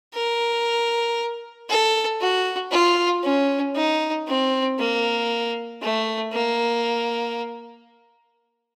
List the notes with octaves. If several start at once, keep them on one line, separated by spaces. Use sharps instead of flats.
A#4
A4
F#4
F4
C#4
D#4
C4
A#3
A3
A#3